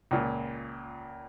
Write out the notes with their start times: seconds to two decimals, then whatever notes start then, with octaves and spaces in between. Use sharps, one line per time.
0.11 C#2 A#2